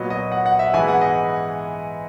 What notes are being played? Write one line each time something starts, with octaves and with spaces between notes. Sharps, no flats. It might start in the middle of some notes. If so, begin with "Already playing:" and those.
Already playing: A#2 F#3 B3 D#5
D#5
F#5
F#5
E5
G#2 E3 B3 G#5
F#5
D#5